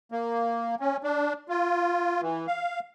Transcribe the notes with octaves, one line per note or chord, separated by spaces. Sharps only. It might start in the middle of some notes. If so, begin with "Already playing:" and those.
A#3
C#4
D4
F4
E3
F5